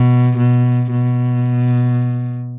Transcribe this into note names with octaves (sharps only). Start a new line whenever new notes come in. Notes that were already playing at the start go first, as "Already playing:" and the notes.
Already playing: B2
B2
B2